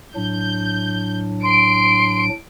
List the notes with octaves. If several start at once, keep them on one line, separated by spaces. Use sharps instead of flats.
A2 F#3 D4 G6
C6 D7